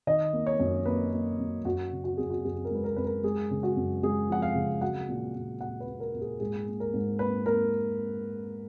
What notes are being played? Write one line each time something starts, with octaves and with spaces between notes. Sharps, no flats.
D#3 D#5
A#3
C#5
F#2
A#3 B4
A#3
F#2
F#2 F#4
C#3
F#4
F#2 G#4
F#4
F#2 G#4
A#4
G#3 B4
A#4
F#2 B4
A#4
G#3 G#4
C#3
F#4
F#2
G#3 G#4
F3 F#5
F5
C#3
F#3 F#5
A#2
A#2
A#2 F#5
B4
A#2
A#4
A#2
G#4
G#2 G#4
A#3
A#4
G#2
A#3 B4
A#3 A#4